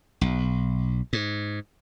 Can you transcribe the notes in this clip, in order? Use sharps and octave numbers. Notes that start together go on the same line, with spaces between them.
B1
G#2